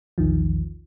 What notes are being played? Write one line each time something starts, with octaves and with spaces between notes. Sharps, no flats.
A#1 E2 D#3 F3